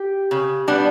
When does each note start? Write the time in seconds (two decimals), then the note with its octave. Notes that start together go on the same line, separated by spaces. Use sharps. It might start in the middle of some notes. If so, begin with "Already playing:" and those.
Already playing: G4
0.31 C#3
0.68 G3 B3 D4